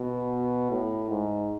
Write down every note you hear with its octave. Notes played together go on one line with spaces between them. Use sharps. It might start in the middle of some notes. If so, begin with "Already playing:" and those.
Already playing: B2
A2
G#2